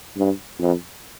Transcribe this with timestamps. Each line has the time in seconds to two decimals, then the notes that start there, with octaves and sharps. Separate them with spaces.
0.17 G2
0.59 F2